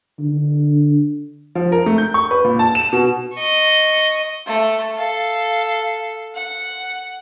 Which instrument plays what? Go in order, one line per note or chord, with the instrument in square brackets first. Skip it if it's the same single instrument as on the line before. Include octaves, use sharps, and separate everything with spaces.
[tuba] D3
[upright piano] F3
A#4
A3
G6
C#6
B4
A#2
A5
E7
B2
[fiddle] D#5 C#6
[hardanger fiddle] A3
A4 F5
F#5